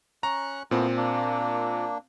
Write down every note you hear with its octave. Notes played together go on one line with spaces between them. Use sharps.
C#4 A#5 C#6 F#6
A#2 A3 B3 C4 E4
A#3 D4